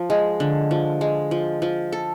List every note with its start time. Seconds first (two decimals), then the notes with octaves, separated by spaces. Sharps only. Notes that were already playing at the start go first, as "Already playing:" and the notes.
Already playing: F3
0.10 G#3
0.40 D3
0.71 F3
1.01 G#3
1.31 F3
1.62 F3
1.92 A4